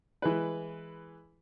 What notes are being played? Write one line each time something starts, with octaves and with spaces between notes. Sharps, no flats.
E3 G#3 B4